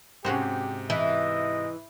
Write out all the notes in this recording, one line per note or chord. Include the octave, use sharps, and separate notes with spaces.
G#2 C3 C#4 F#4 G4 C5
E3 D#5 E5